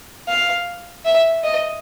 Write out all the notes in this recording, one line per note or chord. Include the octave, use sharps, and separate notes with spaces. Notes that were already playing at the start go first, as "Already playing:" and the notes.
F5
E5
D#5